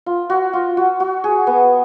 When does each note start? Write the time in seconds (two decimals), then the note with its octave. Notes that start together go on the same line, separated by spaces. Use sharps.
0.06 F4
0.30 F#4
0.53 F4
0.77 F#4
1.00 F#4
1.24 G#4
1.47 B3